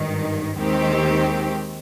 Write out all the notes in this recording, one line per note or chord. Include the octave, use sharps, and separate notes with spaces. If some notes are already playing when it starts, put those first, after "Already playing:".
Already playing: G#1 G2 D#3
D#2 D#3 G#3 C4 G4